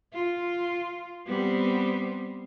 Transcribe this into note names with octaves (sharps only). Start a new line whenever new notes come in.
F4
G3 B3 C4